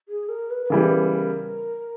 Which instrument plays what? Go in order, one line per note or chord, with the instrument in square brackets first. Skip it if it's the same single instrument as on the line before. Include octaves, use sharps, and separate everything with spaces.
[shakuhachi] G#4
A#4
B4
B4
[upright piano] C#3 E3 G3 B3 [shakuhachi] A#4
[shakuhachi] A#4